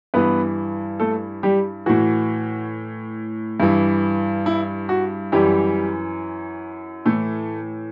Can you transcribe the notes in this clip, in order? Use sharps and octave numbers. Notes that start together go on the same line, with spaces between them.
G2 E3 B3 B4
A3 A4
G3 G4
A2 E3 F#4
G2 E3
E4
F#4
F#2 E3 G3 G4
A2 E3 A3 A4